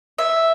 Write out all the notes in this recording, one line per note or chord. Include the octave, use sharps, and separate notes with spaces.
E5